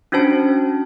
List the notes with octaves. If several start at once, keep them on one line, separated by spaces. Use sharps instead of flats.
C#4 D4 F#4 C5 A5